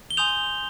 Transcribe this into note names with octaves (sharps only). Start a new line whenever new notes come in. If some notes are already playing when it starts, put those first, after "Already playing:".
G7
G#5 C6 D#6 G6 F7